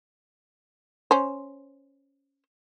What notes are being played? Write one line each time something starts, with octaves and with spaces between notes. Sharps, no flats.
C#4 C5